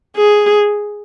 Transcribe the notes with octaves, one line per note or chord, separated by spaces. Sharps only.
G#4